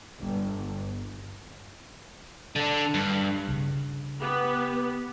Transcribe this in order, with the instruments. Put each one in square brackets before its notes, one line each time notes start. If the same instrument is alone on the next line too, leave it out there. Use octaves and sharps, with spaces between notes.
[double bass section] G1
[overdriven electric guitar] D3 D4
G2
[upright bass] C#3 D4
[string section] B3 [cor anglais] G4